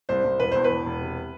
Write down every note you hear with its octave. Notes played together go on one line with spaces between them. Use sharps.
C2 C5
C2
E1 B4
E2 C5
B4
E1
E1
C3